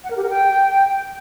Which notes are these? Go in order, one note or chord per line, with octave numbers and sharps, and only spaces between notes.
F#5
A#4
G4
A#4
G5